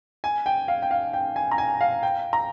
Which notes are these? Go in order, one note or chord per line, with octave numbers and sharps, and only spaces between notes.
G#5
G5
F5
G5
F5
G5
G#5
A#5
G#5
F5
G5
A#5